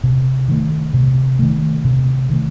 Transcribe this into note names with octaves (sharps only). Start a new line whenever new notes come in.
C3
D#3 A3
C3
D#3 A3
C3
D#3 A3